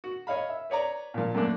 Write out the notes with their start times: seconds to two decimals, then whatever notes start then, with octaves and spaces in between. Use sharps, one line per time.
0.04 F#4
0.27 C#5 D#5 F5 B5
0.49 E5
0.70 B4 C#5 D5 A#5
1.14 A#2 F3
1.35 F#2 A3 A#3 D4